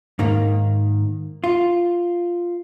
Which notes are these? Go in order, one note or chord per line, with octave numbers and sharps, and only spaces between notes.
G#2 D#3 A#3
F4